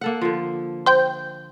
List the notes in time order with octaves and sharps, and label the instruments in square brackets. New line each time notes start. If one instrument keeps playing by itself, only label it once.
[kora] A#3 A4 F#5
D3 F3
[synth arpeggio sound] C5 G5 G6